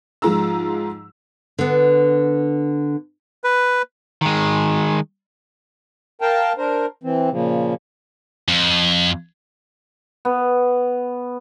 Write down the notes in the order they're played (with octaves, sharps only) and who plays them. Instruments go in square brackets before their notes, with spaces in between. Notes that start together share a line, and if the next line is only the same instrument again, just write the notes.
[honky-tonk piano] G#2 F3 G#3 F4 A#5 E6
[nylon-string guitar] D3 B3
[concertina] B4
[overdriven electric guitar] D#3 G#3
[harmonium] A#4 F5 G5 A5
D4 A#4 C5
E3 C4
A#2 C#3 F3
[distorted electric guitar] F2
[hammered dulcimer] B3